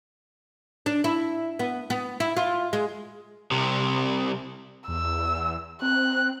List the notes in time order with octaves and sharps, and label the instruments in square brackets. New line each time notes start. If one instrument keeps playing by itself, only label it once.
[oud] D4
E4
B3
B3
E4
F4
G#3
[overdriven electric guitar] C2 C3
[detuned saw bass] E2 [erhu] E6
[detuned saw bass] C4 [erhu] F#6